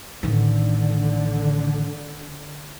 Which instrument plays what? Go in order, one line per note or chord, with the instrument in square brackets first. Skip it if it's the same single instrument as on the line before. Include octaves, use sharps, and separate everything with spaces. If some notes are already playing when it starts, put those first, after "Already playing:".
[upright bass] A1 D#3 [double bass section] D3